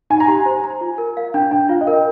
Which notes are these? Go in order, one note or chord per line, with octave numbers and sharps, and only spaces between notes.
D#4 G#5
A#5
G4 G#5
C5
A#5
F4
A#4
F5
D4 G5
D4 G5
F4 F5
D#5
A#4
G5